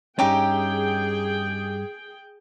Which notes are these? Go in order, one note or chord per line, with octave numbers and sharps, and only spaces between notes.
G2 C#4 D#4 G4 G#4 E5 G5